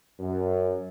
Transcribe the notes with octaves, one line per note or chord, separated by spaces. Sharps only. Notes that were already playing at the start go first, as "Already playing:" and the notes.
F#2